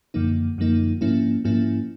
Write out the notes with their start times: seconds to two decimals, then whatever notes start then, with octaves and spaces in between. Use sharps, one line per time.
0.14 F#2 D3 F3 A#3 D#4
0.58 F#2 D3 F3 A#3 D#4
1.01 G#2 F3 A#3 C#4 E4
1.44 G#2 F3 A#3 C#4 E4